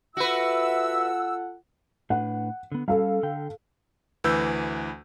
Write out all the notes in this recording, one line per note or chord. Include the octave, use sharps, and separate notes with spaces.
F4 F#4 A4 B4 E5 F#5 E6
A2 D4 B4 F#5
D3 B3
G3 C#4 A4 F5
D3 G5
D2 E3 B4 E6 G6